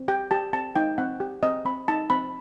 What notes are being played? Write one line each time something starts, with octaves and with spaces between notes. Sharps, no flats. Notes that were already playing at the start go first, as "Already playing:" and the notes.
Already playing: C4
G4 G5
G4 A5
C4 A5
D#4 G5
C4 F#5
G4
C4 D#5
C4 B5
D#4 A5
C4 B5